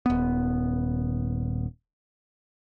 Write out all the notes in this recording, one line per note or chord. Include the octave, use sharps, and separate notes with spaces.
D#1 B3